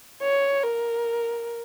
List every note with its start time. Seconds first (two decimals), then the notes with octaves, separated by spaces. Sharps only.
0.23 C#5
0.64 A#4